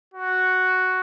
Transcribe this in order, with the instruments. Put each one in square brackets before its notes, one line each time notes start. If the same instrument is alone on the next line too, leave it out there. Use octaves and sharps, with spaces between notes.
[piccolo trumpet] F#4